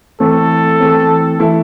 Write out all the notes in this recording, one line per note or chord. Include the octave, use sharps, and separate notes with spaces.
E3 A3 C4 A4
E3 A3 C4
E3 A3 E4 A4